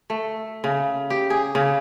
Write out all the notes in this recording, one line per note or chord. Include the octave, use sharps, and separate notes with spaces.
A3
C#3
G4
G#4
C#3